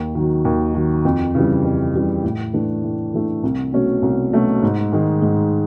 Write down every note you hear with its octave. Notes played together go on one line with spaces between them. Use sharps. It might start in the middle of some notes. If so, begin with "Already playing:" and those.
Already playing: D#2
D#3 F#3
D#2
D#3 F#3
F2
C#3 E3 G3
F2
C#3 E3 G3
A2
E3 A3 D4
A2
E3 A3 D4
C2
B2 F#3 A3 C#4
C2
B2 F#3 A3 C#4
G#2
D#3 G#3
G#2